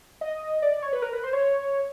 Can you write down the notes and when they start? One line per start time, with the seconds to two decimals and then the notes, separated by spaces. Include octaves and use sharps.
0.21 D#5
0.62 D5
0.73 D5
0.82 C#5
0.93 B4
1.02 A#4
1.13 B4
1.24 C5
1.33 C#5